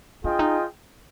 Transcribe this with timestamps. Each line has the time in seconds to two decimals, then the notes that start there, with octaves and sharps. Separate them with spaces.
0.24 D4 F4 G#4 D#5 G5
0.39 D#4